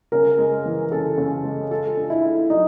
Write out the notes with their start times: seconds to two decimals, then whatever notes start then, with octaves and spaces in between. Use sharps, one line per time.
0.12 C#3 A#4
0.38 G#3
0.66 E3
0.91 C#3 A4
1.18 C#3
1.44 G#3
1.71 F4 A4
1.97 D4
2.10 E4
2.24 A3
2.50 F#3 D#4